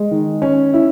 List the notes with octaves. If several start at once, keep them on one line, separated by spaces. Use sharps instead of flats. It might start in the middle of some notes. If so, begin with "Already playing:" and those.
Already playing: G#3
D#3
C#4
E4